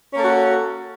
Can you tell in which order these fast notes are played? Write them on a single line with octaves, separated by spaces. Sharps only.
C#4 A#3 A4 F#4